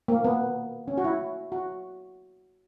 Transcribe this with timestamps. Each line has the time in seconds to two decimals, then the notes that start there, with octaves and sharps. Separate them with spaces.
0.08 A#3
0.25 B3
0.88 C#4
0.98 F#4
1.04 E4
1.52 F#4